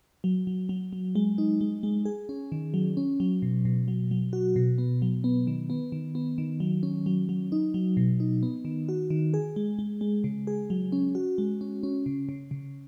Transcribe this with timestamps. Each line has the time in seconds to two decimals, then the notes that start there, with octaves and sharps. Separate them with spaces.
0.24 F#3
0.47 F#3
0.69 F#3
0.93 F#3
1.15 G#3
1.38 D#4
1.61 G#3
1.83 G#3
2.05 G#4
2.29 C#4
2.52 D#3
2.74 F#3
2.97 C#4
3.20 F#3
3.42 B2
3.65 B2
3.88 F#3
4.11 F#3
4.33 F#4
4.56 B2
4.78 B3
5.02 F#3
5.24 B3
5.47 D#3
5.70 B3
5.92 D#3
6.15 B3
6.38 D#3
6.60 F#3
6.83 C#4
7.06 F#3
7.29 F#3
7.52 D#4
7.74 F#3
7.97 B2
8.20 D#4
8.43 B3
8.65 D#3
8.89 F#4
9.10 D#3
9.34 G#4
9.56 G#3
9.79 G#3
10.01 G#3
10.24 C#3
10.47 G#4
10.70 F#3
10.92 C#4
11.15 F#4
11.38 G#3
11.61 C#4
11.83 C#4
12.06 C#3
12.29 C#3
12.51 C#3